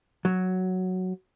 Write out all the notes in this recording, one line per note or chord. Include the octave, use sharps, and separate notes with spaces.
F#3